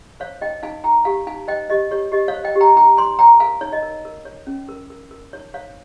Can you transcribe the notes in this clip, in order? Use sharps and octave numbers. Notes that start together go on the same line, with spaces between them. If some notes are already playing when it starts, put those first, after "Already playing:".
C5 C#5 F5
D#4 D#5 G5
D#4 F5 G#5
D#4 G5 A#5
G4 F5 G#5
D#4 F5 G#5
C5 D#5 G5
G4 D#5
G4 C#5
G4 D#5
C#5 F5
C5
D#5 G5
G4
G5 A#5
D#4 G5 A#5
C#5 G#5 C6
C#5 G5 A#5
A#4 F5 G#5
D#4 C#5
D#5
A#4
A#4
C#5
C#4
A#4
A#4
A#4
D#4 C#5
C5 C#5 F5